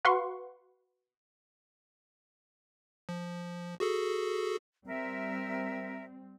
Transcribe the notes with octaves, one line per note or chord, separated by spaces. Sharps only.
F#4 B4 F5 F#5 C6 C#6
F3
F#4 G#4 A4
G3 C4 A#4 E5